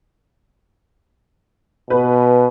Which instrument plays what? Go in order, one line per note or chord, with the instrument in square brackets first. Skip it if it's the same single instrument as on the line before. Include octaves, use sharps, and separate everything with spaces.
[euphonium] B2 [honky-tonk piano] B4